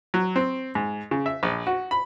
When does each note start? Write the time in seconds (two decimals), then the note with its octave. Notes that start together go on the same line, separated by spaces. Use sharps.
0.14 F#3
0.36 C4
0.75 G#2
1.11 C#3
1.26 E5
1.43 A#1
1.67 F#4
1.91 B5